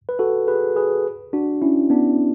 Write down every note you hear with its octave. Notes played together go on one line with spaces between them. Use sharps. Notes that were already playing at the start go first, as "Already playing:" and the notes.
B4
F#4 A4
G#4 B4
G#4 B4
D4 F#4
C#4 E4
B3 D4